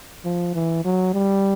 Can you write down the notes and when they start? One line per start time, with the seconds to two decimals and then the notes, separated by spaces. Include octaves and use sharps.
0.25 F3
0.54 E3
0.85 F#3
1.14 G3